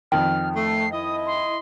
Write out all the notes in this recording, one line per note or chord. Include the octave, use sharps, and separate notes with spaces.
F2 D#3 G5 F6
A3 C7
E4 D#5 D#6
C6